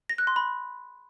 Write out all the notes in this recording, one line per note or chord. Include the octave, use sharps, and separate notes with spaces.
A#6
F#6
C6
B5